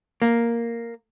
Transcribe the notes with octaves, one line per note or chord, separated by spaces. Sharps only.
A#3